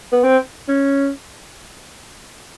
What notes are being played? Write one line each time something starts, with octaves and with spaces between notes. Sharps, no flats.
B3
C4
C#4